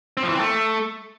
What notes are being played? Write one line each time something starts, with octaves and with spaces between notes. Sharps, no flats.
C4
F3
E3
C4
A3